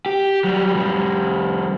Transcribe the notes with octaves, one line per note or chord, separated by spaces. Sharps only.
G4
F#3 G3
F2 G3